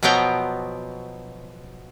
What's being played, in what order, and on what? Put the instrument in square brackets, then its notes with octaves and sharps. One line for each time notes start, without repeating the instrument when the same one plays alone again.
[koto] B2 F3 F#3 B3 G5 A#5